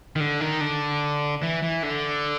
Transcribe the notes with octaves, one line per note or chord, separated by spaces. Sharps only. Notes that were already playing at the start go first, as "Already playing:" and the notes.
D#3
D3
D#3
D3
E3
E3
D3